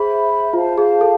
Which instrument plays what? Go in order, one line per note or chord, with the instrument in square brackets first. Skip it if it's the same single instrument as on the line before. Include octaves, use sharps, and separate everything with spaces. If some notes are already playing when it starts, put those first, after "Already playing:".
Already playing: [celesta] G#4 [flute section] C5 E5 B5
[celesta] F4 [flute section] C5 F5 A5
[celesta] G#4
A4